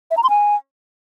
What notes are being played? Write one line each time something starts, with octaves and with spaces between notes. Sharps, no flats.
E5
A#5
C6
G#5